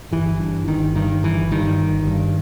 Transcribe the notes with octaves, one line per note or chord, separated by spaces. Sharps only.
G1 E3
G2
G1 D#3
G2 D#3
G1 E3
G2 D#3
G1
G2